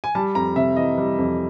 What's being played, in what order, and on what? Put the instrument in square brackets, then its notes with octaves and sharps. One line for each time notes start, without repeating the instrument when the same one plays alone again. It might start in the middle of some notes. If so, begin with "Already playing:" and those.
[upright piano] G#5
G3 A5
F2 A#5
C3 E5
E3 D#5
G3
F2